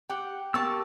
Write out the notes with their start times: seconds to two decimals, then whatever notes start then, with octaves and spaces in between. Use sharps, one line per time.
0.10 G4 F#5 G5 D6 C#7
0.54 A#3 B3 C#4 G4 G5 A5 C#6 E6